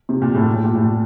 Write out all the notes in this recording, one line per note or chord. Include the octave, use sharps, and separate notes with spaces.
C3
A#2
A2
A#2
A2
A#2
A2
A#2